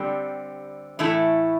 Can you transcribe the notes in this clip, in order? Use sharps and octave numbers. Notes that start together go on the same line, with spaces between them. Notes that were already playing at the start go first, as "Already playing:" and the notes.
Already playing: D3 G3 C4 G4
A2 E3 A3 E4 A4